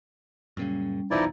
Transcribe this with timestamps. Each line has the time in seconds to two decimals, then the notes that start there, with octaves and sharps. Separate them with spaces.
0.57 F#2 A#2 C#3 G3 C#4
1.11 F1 B1 E2 E3 F3 D#4 E4 D5